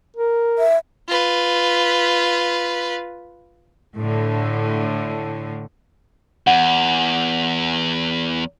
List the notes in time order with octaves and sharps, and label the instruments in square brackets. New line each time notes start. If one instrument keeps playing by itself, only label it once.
[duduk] A#4
[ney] E5
[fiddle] F4 B4
[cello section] A2 D3
[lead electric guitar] E2 [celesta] F#5